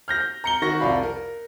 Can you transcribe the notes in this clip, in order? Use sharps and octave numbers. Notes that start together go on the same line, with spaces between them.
F6 G6 A#6
A#5 C#7 G7
D#3 F#4 C#6 A#6
C2 F2 D5 F5 B5
A#4